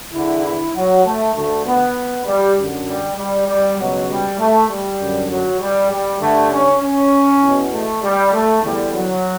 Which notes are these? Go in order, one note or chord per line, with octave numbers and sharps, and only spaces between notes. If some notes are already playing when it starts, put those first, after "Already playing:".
E2 D3 E4
E4
F#3
A3
D2 D3 A3
B3
G3
F#2 D3
G3
G3
G3
C#2 B2 F#3
G3
A3
G3
F#2 D3
F#3
G3
G3
G2 D3 A3
C#4
C#4
E2 B2
A3
G3
A3
E2 D3 G3
F#3